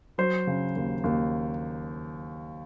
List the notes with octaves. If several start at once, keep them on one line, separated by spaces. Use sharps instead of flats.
F#3 C5
C#3
D#2
D#2